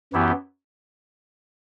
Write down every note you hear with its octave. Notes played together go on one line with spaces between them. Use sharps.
F#2 E3 B3 E4 G4